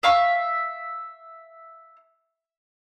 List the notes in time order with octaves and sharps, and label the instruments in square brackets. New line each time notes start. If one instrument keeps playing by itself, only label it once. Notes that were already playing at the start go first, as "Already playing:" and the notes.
[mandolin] E5 F5 C#6